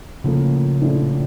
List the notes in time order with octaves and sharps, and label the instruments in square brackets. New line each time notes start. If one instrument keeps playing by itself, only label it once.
[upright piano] A2 F3 A#3 [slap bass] C#3
[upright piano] A#1 A2 F3 C#4 E4